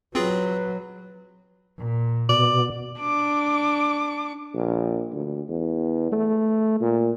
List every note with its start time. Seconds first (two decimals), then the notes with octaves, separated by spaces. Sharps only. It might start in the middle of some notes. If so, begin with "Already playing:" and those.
0.15 F#3 C4 F4 G#4 B4
1.78 A#2
2.29 B2 D5
3.00 D4 D6
4.55 A#1
5.12 D2
5.49 E2
6.12 A3
6.80 A#2